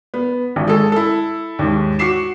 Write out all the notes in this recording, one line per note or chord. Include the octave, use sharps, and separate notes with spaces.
B3
G#1
G#3 A4
E4 A4
D#2 G#2
F#4 C#6 D6 C7 E7